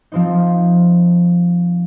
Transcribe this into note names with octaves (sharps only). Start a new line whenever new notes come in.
F3 C4 D#4